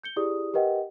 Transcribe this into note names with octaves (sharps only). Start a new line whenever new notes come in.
G6 C#7 G7
E4 G4 G#4 D5 D#6
G4 A#4 B4 D#5 F#5 G5